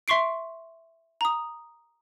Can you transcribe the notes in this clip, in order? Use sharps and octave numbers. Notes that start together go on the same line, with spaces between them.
E5 C6 C#6 C7 D7
A#5 D#6